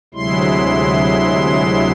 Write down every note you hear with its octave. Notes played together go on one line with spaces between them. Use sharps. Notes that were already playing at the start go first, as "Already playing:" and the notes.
D2 C3 F#3 G#3 E4 C6